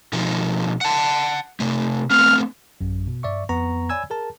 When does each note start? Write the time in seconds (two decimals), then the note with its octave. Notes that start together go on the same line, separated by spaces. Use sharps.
0.13 B2 F3 D#4
0.81 F#5 A5
1.60 C3 A3
2.10 A3 B3 C4 F6
2.81 A1 F#2
3.07 B2
3.23 G2 D5 E5 C#6
3.49 F2 B3 A#5 C#6
3.89 C#5 D5 G#5 B5 E6 G#6
4.10 G#4 A#4 A5